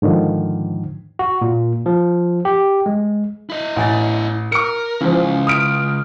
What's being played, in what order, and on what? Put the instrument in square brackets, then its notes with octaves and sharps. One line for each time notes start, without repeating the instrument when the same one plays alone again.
[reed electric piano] G#2 D3 D#3 F3
[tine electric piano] F#4
A#2
F3
G4
G#3
[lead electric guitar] E4 D#5
[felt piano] A1 G#5 A6
[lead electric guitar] A#4 [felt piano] D6 C#7
[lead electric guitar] C#2 [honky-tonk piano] C#3 F3 [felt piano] E3
[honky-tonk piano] D#6 F6 D7